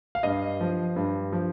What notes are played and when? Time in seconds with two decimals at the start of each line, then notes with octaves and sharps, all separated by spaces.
0.15 F5
0.23 G2 D#5
0.61 F3
0.96 G2
1.33 F3